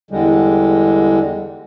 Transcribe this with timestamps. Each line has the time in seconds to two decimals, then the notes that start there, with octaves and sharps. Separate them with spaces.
0.11 E2 D3 G3 G#3